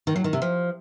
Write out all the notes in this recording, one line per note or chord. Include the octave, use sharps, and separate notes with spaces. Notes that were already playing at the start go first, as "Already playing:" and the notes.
D#3
F#3
D#3
C3
F3